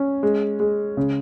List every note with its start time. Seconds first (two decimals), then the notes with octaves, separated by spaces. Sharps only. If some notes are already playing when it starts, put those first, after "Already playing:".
Already playing: C#4
0.23 G#3
0.60 G#3
0.97 C#3